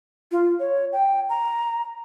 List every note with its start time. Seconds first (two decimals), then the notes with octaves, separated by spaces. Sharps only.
0.32 F4
0.60 C#5
0.93 G5
1.29 A#5